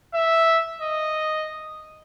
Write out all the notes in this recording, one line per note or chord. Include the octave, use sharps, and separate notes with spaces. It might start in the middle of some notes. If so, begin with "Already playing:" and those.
E5
D#5